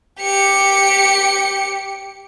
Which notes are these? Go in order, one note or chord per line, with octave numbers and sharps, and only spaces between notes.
G4 C#7